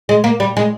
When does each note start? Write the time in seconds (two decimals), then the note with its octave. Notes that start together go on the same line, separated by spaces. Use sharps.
0.09 G#3
0.24 A#3
0.40 G3
0.57 G#3